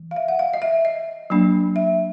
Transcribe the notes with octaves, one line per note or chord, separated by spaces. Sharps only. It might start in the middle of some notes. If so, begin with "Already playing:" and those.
Already playing: E3
F5
E5
F#5
F5
D#5
E5
D#5
F#3 A#3 D4
E5